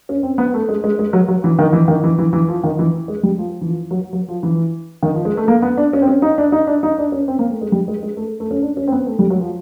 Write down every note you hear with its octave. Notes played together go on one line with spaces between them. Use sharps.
C#4
C4
B3
A3
G#3
G#3
G#3
F#3
F#3
E3
D#3
E3
D#3
E3
E3
E3
F3
D#3
E3
G#3
G3
F3
E3
F3
F#3
F#3
F3
E3
D#3
F3
G#3
A3
A#3
B3
D4
C#4
C4
C#4
D#4
D4
D#4
D4
D#4
D4
C#4
C4
A#3
A3
G#3
G3
G#3
G#3
A3
A3
C#4
D4
C#4
C4
B3
A3
G3
F#3
F3